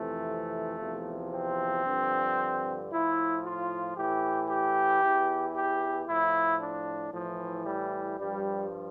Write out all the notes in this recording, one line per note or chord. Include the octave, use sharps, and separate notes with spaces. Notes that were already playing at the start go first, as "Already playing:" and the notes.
Already playing: F2 C3 E3 A3
E2 C3 F3
C4
G2 D3 F3
A2 F3 E4
F4
A2 E3 G4
G4
E2 E3
G4
A2 F3 E4
D4
A2 E3 F3
G3
G2 F3 G3